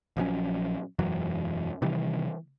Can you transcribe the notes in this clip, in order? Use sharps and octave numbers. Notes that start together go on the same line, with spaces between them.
A#1 F3 F#3 C#4
E1 F#2 E3 F#3
C3 D#3 E3 G3